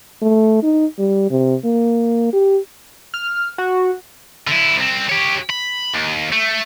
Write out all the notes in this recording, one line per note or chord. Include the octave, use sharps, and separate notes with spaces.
A3
D#4
G3
C3
A#3
G4
F6
F#4
D3 E4
C2 C4
G4 C#5
B5
D#2
A3